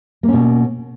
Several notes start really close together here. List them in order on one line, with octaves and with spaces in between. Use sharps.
A#3 C#4 B2